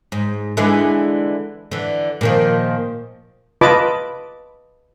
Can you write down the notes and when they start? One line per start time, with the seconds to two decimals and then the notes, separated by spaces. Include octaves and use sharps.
0.12 G#2
0.57 D3 E3 G#3
1.72 D3 E3
2.21 A#2 D#3 F3
3.61 F4 B4 D#5 A5 B5 D6